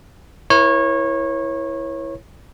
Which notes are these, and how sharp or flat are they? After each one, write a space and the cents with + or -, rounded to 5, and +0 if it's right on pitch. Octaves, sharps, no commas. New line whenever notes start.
E4 +0 A#4 +45 C#5 -25